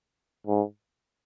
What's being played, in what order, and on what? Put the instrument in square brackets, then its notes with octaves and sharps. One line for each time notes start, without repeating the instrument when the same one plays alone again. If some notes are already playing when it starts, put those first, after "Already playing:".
[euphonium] G#2